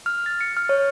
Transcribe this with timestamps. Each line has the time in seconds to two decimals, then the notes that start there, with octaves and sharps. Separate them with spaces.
0.06 F6
0.26 A6
0.41 C#7
0.57 F6
0.69 C#5